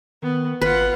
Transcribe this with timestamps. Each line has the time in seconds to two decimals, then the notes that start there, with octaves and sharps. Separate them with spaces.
0.23 D#3 B3
0.61 G#1 F4 B4 F#5